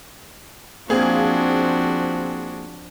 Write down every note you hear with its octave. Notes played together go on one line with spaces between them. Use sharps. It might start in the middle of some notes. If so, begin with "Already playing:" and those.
F3 A#3 C4 D4 F#4 G#4